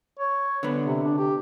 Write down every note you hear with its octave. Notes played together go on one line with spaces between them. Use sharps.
C#5
D3 B3
C3
D4
G4